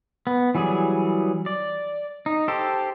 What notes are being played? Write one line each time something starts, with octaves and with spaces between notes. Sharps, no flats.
B3
E3 F#3 G3 G#4
D5
D#4
G4 A4 C5